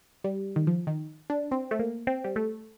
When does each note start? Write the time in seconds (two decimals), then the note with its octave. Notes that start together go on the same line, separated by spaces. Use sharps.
0.24 G3
0.56 D#3
0.67 F3
0.87 D#3
1.30 D4
1.51 C4
1.71 A3
1.79 A#3
2.07 C4
2.24 G3
2.36 A3